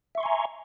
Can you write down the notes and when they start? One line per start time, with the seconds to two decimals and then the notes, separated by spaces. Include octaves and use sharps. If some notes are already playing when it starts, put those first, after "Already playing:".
0.15 E5
0.18 C#6
0.20 C6
0.23 G#5
0.26 A#5